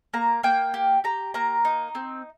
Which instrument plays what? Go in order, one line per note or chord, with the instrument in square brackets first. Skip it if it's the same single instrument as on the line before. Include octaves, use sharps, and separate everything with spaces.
[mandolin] A#3 A#5
A#3 G5
G4
G4 A#5
A#3 A#5
D#4
C4